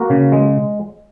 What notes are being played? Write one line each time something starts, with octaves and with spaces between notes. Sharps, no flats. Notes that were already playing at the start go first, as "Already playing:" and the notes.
Already playing: A#3 F#4 A#4
C#3
G#3